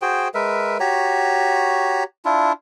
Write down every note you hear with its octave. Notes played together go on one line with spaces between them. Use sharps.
F#4 G#4 C5 G5
G#3 A#4 B4 E5
F#4 G4 C#5 A#5
D4 E4 F4